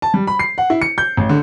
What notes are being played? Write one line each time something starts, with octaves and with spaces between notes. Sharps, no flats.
A5
G3
B5
C7
F#5
E4
C#7
G6
A1
D3